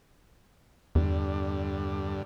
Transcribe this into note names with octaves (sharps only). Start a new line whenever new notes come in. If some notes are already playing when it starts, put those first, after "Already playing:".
E2 G2 D3